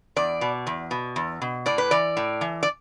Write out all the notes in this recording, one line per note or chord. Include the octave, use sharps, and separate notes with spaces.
E2 D5
B2
E2
B2
E2
B2
A2 D5
B4
E3 D5
A2
E3
D5